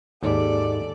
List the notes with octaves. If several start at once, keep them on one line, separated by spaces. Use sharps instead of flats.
D#2 G#2 G4 A4 D5